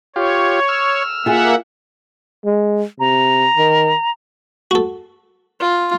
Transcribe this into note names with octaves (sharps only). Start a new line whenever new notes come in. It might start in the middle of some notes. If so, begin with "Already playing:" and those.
F4 G4 C#5
E6 F6
A#3 F4 G#4 E5 F#5
G#3
C3 A#5
D#3
F#4 A4
F4